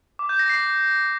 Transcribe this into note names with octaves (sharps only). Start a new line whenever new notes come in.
D6
G6
A#6
C7